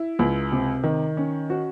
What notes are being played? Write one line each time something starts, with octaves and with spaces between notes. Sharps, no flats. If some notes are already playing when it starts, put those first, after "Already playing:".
Already playing: E4
C#2
C3
D#3
C#4
F#4